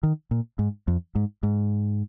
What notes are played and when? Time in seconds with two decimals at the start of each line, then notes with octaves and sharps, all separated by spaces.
0.03 D#3
0.31 A#2
0.59 G#2
0.88 F2
1.15 G#2
1.43 G#2